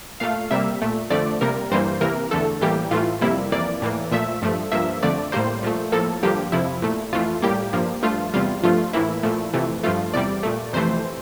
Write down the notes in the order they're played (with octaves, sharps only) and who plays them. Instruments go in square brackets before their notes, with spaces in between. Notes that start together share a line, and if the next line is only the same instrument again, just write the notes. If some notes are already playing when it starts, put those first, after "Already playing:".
[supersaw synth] A#2 A3 F5
C3 G3 A#3 E5
A#2 A3
F2 D3 F3 A3 D5
C3 G3 A#3 A#4
G2 E3 G3 A#3 C5
C3 E3 A#3 A#4
E2 D3 A3 A4
A2 E3 G3 A#3 G4
A2 E3 A3 F4
F2 C3 G3 A#3 E4
F2 E3 A#3 D5
A2 E3 A#3
A#2 F3 A3 E5
G2 F3 A3
G2 F3 A#3 E5
F2 D3 A3 D5
A2 G3 A#3 C5
A#2 F3 A3
A2 F3 A#3 A4
G2 D3 F3 A#3 G4
F2 C3 F3 E4
A#2 A3
F2 E3 A3 F4
A2 G3 A#3 G4
G2 F3 A#3
G2 F3 A3 F4
E2 C3 G3 F4
G2 F3 A3 F4
A2 E3 A#3 E4
A#2 F3 A3
F2 C3 E3 A3
G2 F3 A3 F4
E2 C3 G3 D5
A#2 A3
F2 C3 E3 A3 C5